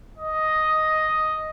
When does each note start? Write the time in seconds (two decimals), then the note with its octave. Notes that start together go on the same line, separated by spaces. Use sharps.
0.18 D#5